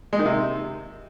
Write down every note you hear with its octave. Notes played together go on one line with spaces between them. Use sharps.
G#3
D#3
C3